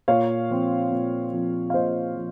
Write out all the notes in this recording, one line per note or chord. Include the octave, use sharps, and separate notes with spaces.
A#2 C#5 F5
F3 C4
A#2
F3 C4
F5
A#2 C5 D#5
F3